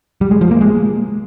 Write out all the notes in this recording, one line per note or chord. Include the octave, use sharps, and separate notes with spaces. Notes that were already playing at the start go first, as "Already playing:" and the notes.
G3
G#3
F3
A#3
G#3